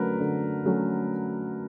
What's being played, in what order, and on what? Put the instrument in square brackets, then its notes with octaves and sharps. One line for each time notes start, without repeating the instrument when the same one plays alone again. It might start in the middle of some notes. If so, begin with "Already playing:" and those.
Already playing: [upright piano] D3 F#3 A3 C#4 [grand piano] A#4 B4
[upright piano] D3
F#3 A3 C#4